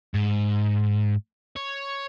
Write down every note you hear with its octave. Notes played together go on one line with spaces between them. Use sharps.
G#2
C#5